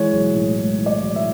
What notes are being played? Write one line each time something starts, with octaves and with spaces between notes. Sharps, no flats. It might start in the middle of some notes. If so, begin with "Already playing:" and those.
Already playing: E3 G#3 C#5
B1
A2
G#3
E3
D5
B1
E5